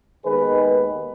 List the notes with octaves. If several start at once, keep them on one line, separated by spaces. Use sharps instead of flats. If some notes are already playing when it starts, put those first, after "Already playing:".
D#2 D#3 G#3 B3 G#4 B4